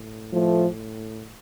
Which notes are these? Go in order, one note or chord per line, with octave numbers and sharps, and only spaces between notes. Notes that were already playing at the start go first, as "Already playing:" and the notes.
Already playing: A2
F3 A3